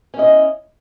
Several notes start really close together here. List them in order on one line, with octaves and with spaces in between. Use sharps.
C#4 E4 D#5